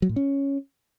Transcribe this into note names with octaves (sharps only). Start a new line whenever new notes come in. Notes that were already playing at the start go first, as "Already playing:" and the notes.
F#3
A2
C#4